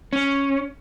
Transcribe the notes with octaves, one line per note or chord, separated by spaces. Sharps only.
C#4